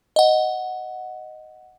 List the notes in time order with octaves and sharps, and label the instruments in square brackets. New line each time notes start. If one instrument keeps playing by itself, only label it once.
[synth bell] D#5 F#5